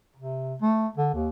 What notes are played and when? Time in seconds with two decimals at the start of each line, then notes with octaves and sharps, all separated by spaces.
0.16 C3
0.61 A3
0.97 D3
1.14 D#2